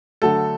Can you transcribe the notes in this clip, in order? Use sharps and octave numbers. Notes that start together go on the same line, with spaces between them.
D3 F#3 A3 A4